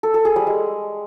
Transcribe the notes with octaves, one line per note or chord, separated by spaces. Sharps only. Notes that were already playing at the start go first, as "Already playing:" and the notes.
A4
A4
G#4
G3
G#3